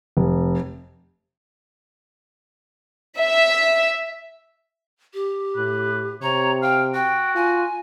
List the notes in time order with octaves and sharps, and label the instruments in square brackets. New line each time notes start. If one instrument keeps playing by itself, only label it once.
[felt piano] F1
[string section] E5
[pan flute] G4
[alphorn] A2 [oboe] B4
[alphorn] C3 [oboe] C#5 [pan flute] A#5
[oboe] F5 [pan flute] G5
[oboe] F#4 [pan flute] G5
[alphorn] F4 [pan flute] G#5